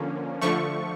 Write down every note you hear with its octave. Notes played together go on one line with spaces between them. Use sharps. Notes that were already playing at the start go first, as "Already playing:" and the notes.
Already playing: D3 F3 A#3 C#4
D3 F3 A3 C#6